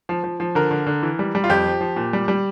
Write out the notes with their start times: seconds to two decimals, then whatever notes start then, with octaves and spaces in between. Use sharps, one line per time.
0.09 F3
0.24 F3
0.40 F3
0.55 D3 A#4
0.71 D3
0.86 D3
1.03 E3
1.19 G3
1.35 G3
1.44 F4
1.50 F2 G4
1.66 F3
1.81 F3
1.96 A#2
2.13 G3
2.28 G3